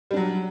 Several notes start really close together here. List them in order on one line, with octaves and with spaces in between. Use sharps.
G3 D4 F#3